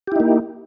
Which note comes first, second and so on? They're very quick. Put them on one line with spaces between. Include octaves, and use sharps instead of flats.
G4 E4 D#4 A#3